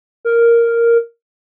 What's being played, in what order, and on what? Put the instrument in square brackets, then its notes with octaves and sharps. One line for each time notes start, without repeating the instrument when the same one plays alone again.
[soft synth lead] A#4